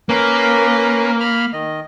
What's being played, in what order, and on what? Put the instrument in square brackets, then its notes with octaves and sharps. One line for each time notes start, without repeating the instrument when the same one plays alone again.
[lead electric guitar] A#3 [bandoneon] C#4 A#4 B4
[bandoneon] B5 F6
D#3 D#5